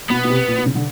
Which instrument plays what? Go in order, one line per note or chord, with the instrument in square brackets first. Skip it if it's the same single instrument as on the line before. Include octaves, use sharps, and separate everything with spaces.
[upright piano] B2 [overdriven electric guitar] B3
[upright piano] B2
C3
A#2
B2
C#3
D3